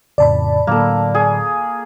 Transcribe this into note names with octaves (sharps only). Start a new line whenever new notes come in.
F2 A2 C#3 D5 A5 B5
A2 D3 F#3 A#3 A4
G#4